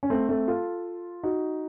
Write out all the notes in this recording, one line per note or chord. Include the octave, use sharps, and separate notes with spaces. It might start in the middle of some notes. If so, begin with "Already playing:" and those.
C#4
A3 C4
A3 C4
F4 A4
D#4 F#4